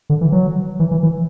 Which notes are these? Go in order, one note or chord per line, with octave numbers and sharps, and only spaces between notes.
D3
E3
F#3
E3
E3
E3